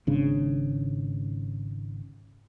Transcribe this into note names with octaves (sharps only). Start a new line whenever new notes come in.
G#1 G#2 C#3 D4